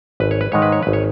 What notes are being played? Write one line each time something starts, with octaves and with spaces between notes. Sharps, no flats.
G#1 B4
C#5
B4
G#2 D#3 G#3 C#5
B4
C#5
G#1 B4
C#5